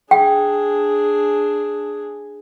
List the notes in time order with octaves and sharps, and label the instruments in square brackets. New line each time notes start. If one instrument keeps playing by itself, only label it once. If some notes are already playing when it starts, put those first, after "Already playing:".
[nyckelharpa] D4 G#4 [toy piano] G5